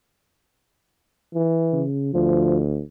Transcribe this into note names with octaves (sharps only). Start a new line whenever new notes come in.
E3
C#3
D2 F3